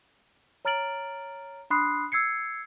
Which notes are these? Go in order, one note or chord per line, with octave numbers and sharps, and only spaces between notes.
C#5 A#5 F6 A6 D7 F#7
D4 B5 C6 D#6 F#6 C7
E6 G#6 C7 C#7